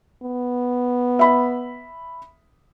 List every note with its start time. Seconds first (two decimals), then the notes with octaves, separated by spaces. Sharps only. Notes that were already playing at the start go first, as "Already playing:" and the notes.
0.23 B3
1.19 E5 B5